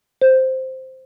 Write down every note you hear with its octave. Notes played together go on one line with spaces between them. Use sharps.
C5